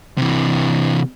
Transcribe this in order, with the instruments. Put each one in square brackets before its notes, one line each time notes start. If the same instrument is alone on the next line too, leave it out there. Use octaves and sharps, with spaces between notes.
[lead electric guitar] C3 E3